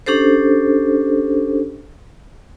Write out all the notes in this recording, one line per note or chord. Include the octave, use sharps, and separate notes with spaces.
C#4 D4 G4 A4 C5